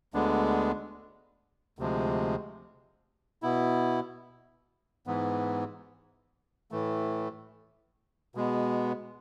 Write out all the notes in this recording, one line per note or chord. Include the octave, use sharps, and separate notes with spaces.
D2 D3 G#3 B3 D4
D2 C3 F3 G#3
B2 B3 E4
G#2 E3 B3
A2 E3 A3
B2 G#3 B3